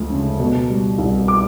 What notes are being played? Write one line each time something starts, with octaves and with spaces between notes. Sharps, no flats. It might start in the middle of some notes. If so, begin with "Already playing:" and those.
Already playing: D2 F3 G#3
C#3
B2
G3
C2
D6